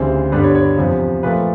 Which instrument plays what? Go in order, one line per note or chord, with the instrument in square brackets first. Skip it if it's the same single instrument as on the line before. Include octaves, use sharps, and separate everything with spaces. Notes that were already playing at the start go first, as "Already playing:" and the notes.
Already playing: [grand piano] D2 C#3 E3 G3 C4
G2 D3 G3 B3 D4 B4
C#5
C#5
E2 C3 F3
A#2 F3 A3 B4